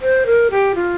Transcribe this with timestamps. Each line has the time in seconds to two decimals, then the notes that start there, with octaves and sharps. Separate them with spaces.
0.02 C5
0.26 A#4
0.51 G4
0.75 F4